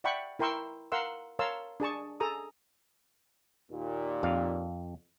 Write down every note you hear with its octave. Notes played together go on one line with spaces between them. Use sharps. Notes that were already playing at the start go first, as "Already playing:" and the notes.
D5 E5 F#5 G5 B5 C#6
E4 A#4 G5 C6 C#6 E6
A#4 F5 F#5 C6 E6
A#4 C#5 F5 A5 C6 E6
D4 G#4 A5 C#6
G#4 A4 A#5 D#6
D#2 A#2
F2 F5